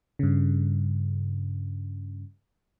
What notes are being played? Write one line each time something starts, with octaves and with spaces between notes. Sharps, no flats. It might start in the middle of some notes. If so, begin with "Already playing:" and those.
G2 C#3